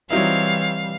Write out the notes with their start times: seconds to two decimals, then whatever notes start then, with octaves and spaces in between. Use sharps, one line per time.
0.10 E3 F#3 G3 C4 D#4 E4 C#5 F5